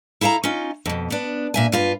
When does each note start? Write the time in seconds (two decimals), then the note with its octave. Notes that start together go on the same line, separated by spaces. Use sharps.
0.21 E4 A4 F5 G5 A#5
0.44 C#4 D#4 F4
0.86 F2 B2
1.10 B3 D4
1.54 A#2 E5 G#5
1.72 G2 F4 B4